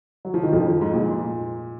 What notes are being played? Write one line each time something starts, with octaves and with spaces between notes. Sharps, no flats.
F#3
F3
D#3
F2 F3
G#2
A#2